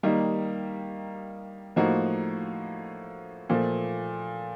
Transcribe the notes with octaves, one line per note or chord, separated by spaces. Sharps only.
D#3 G3 A#3 D#4
A2 F3 A#3 D#4 F#4
A#2 F3 A3